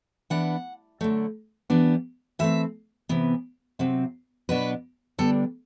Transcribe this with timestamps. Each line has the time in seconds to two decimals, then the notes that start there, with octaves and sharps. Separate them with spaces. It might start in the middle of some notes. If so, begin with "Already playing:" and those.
0.30 E3 B3 D4 F#5
1.01 D3 F#3 A3
1.70 E3 G3 B3 D4
2.39 E3 A3 C4 E5
3.09 C3 E3 B3
3.79 C3 F#3 C4
4.49 B2 F#3 B3 D4 B4
5.18 D3 G3 B3 D4 A4